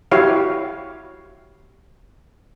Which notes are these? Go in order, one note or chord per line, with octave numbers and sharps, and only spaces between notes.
E4 F#4 G4 C#5 F5